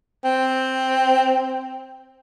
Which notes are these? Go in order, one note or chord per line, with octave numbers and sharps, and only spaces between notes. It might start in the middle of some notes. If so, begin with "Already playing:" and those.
C4